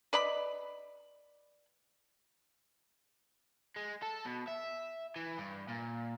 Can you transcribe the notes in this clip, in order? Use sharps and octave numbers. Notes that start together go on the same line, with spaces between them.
B4 D5 D#5 B5
G#3
A4
B2
E5
E3
G2
A#2